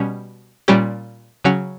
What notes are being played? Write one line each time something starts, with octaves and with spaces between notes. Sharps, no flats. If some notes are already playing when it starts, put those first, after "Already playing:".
Already playing: B2 G3 C#4
A#2 G3 C#4 G4
C#3 F#3 C#4 F#4